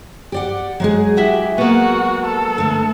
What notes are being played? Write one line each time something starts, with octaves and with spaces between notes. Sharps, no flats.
G4 D5 F#5
F#3 G#3 G#4
E4 F#4 G4 E5
A#3 B3 F#4
A4
D3 A3